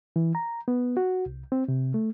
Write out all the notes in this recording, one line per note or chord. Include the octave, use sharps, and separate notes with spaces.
E3
A#5
B3
F#4
C2
C4
C3
A3